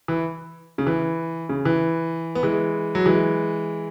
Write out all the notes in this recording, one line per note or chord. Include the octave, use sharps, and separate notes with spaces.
E3
C#3
E3
C#3
E3
B3
E3 G#3
F#3
E3 G#3